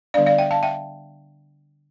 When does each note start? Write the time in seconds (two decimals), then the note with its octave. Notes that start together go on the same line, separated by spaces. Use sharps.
0.14 D3 G3 B3 D4 D5 F5
0.26 D5 F5
0.38 E5 G5
0.51 F5 A5
0.63 E5 G5